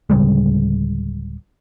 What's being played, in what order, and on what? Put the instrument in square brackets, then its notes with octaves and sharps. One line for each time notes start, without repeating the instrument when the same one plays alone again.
[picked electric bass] D1 C#3 G3 G#3